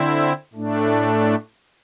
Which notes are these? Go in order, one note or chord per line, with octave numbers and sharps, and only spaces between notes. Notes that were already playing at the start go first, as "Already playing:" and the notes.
Already playing: D3 C4 E4
A2 A3 D4